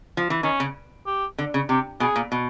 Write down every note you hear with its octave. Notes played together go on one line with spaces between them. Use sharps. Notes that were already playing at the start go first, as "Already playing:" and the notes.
F3
E3
D#3 C#4
C#3
G4
D3
C#3
C3 G4
B2 G#4
A#2
B2